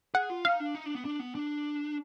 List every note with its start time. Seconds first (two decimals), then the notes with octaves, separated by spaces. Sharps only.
0.14 G#4 F#5
0.30 F4
0.45 D#4 F5
0.60 D4
0.75 D#4
0.86 D4
0.95 B3
1.05 D4
1.20 B3
1.35 D4